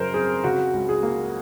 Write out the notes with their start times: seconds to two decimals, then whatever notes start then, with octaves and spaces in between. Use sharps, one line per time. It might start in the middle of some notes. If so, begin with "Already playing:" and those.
Already playing: F#2 C#3 A#4 C5
0.14 C4 G#4
0.44 C#3 F#4
0.73 C#2
0.89 G#4
1.03 A#3